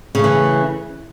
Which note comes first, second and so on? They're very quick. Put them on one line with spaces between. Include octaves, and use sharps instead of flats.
C#3 A3 E3